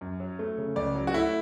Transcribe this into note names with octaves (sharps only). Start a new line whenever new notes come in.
F#2
F#3
A3
C#3
C#2 D5
F#3
F#4
A3 E4